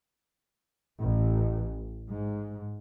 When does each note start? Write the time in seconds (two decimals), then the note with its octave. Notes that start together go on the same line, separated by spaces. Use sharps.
1.01 A1
2.09 G#2